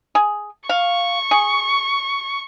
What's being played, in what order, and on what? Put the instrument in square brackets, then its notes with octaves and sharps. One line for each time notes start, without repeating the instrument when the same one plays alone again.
[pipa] G#4
[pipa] F5 [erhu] C#6
[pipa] G#4